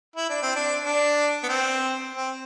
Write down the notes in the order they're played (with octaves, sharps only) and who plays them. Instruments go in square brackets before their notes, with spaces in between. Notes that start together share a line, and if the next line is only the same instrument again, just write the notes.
[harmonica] E4
D4
C4
D4
D4
B3
C4
C4